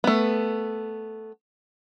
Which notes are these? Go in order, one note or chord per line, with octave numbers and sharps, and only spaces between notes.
A3 B3